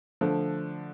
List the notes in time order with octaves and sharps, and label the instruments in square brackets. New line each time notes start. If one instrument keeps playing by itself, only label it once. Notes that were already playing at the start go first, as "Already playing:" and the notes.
[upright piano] D3 F3 A3